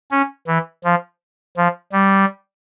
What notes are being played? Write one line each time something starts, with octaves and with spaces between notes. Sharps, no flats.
C#4
E3
F3
F3
G3